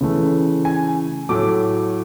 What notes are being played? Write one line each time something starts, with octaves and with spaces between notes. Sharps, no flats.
C#3 E3 A3
G#5
A2 F#3 A3 D6